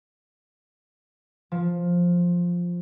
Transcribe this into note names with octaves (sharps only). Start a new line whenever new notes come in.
F3